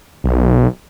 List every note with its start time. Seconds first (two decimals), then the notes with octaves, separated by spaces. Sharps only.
0.24 B1